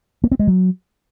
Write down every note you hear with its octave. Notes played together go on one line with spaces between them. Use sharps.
A#3
C4
G#3
F#3